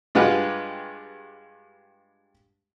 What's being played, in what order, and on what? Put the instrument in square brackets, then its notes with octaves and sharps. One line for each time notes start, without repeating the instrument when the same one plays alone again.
[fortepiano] G2 G#3 F4 G4 B4 F#5